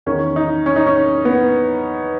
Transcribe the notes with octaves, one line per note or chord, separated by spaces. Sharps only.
E2 D#3 C#4
D#4
C#4
D#4
C#4
B3